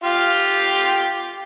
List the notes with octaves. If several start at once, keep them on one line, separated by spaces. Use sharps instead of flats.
F4 G4 F5